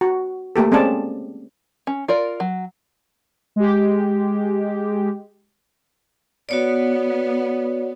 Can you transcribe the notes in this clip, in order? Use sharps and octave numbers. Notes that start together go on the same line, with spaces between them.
F#4
A3 A#3 G4 A4
G#3 C4 C#4 G#4 D5 A5
C#4
F4 A#4 D5
F#3
G#3 G4
B3 F#4 C#5 D5